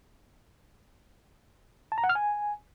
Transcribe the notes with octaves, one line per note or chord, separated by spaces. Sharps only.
A5
A#5
F#5
F6
G#5